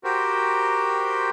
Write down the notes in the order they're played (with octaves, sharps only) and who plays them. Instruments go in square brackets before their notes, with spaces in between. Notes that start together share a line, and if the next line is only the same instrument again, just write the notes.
[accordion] F#4 G4 A#4 C5 G5